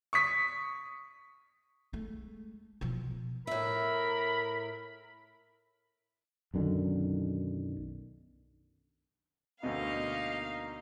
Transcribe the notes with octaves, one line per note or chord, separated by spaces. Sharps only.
C#6 D#6 B6
G#3 A3
B2 F3
A2 A#4 E5 B5
B1 F#2 D3 D#3
D2 B2 A#3 D#4 F5